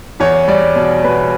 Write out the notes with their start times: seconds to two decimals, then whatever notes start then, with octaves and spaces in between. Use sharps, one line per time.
0.20 E2 C#5
0.48 G3 D5
0.76 B2 D5
1.04 B2 B4